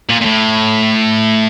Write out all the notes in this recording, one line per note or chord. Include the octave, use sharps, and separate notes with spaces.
A#2
A#2
A2